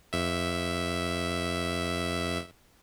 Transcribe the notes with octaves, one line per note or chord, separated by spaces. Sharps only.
F2 E5